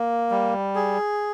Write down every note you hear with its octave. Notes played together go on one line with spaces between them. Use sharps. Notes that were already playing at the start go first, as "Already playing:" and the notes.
Already playing: A#3
G3
G#4